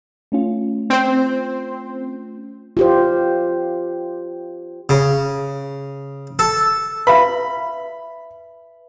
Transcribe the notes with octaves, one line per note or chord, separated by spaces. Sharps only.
A3 C#4 F4
C4 C5
F4 G4 C5
C#3
A4
B4 E5 B5